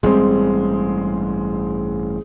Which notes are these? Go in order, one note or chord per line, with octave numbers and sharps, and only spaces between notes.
A1 G2 G3 G#3 C4